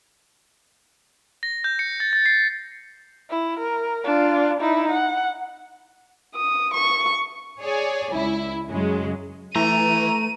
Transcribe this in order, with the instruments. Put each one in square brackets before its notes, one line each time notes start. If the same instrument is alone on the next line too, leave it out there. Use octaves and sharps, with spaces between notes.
[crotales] A#6
G6
C#7
A6
A6
C7
[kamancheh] E4
A#4
D4 F4
D#4 E4
F#5
D#6
C#6
[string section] G#4 C#5 D5 G#5
C#2 E4
F#2 C#3 F#3 G#3
[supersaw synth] E3 [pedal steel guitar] A3 [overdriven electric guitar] A#5 [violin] D#7